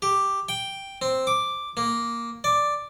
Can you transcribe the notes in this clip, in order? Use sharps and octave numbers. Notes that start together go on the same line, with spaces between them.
G4
G5
C4
D6
A#3
D5